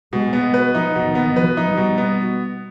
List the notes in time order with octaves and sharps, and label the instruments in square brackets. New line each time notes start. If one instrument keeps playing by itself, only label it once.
[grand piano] B2 [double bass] G#3
[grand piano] B3
B4
[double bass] F3 [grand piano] D#4
[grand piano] B2
[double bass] D#3
[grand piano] B3
[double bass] F3 [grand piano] B4
[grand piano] D#4
[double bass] G3
[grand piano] B2
B3